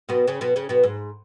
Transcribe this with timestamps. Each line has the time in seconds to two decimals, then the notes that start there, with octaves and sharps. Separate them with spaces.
0.09 B2 B3
0.28 C#3 C#4
0.41 B2 B3
0.56 C#3 C#4
0.69 B2 B3
0.83 G#2